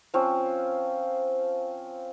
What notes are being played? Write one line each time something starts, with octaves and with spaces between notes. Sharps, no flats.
F3 C4 C#4 F4